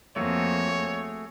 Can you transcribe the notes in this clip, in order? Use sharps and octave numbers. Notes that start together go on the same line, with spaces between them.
F2 A3 A#3 F#4 G#4 C#5